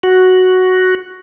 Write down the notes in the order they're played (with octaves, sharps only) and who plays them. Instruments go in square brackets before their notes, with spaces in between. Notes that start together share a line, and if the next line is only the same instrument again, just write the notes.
[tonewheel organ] F#4